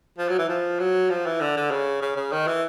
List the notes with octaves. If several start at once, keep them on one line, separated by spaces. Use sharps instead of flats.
F3
F#3
E3
F3
F#3
F3
E3
D3
D3
C#3
C#3
C#3
D#3
E3